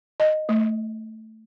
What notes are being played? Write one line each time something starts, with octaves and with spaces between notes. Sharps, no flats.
D#5
A3